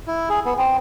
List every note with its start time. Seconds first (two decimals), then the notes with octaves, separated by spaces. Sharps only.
0.07 E4
0.30 G#4
0.45 B3
0.58 C4